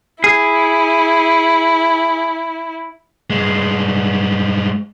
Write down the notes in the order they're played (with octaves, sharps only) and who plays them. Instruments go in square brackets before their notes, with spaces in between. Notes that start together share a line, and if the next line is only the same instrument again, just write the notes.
[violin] E4 [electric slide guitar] G#4
[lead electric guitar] G2 G#3